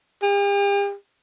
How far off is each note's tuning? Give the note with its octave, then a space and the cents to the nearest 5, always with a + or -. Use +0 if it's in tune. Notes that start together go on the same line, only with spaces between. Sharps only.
G4 +45